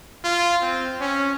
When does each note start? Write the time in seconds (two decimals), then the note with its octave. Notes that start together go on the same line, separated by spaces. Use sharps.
0.24 F4
0.62 C4
1.01 C#4